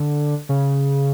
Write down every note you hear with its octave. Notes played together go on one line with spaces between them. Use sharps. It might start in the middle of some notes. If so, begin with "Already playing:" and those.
Already playing: D3
C#3